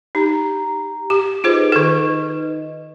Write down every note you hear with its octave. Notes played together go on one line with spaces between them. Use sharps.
D#4 G4 A#5
G4
D#4 F4 G#4 B4 C5 D#5
D#3 A4